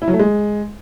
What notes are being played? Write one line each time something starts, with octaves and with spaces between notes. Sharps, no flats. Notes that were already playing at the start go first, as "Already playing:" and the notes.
E4
F#3
A3
G#3